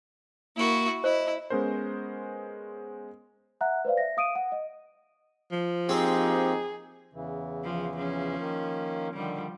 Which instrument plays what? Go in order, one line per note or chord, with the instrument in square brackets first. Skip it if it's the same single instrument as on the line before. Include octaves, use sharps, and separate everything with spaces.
[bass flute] A#3 [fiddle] E4 F#4
[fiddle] E4 [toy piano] C5 [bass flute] D#5
[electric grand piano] G#3 B3 C#4 A#4 C5
[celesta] E5 F#5 A#5 F#6
B4 C5 D5 F5
E5 A#6
F5 D#6 D7 D#7
F#5
D#5
[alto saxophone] F3
[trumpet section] A#3 D#4 G4 [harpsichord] C4 [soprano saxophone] G#4
[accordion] E2 C#3 E3
[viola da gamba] F3
F3 C#4
[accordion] D#3 A#3
[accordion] D3 D#3 [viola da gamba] F3 G3